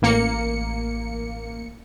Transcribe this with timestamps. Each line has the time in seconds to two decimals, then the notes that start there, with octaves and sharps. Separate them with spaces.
0.02 A1 A#3 C#7